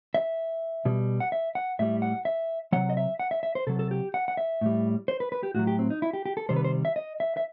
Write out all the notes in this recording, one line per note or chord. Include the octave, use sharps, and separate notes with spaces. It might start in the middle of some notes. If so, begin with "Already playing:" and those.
E5
B2 G3
F#5
E5
F#5
A2 G3 E5
F#5
E5
C3 F#3 F#5
D#5
E5
F#5
E5
E5
C5
C3 F#3 A4
A4
G4
F#5
F#5
E5
A2 G3
C5
B4
B4
G4
A2 F#3 F#4
G4
C4
D#4
E4
G4
G4
A4
C3 D#3 G3 C5
B4
C5
E5
D#5
E5
E5